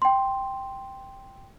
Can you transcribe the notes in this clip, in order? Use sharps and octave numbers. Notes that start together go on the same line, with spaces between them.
G5 C6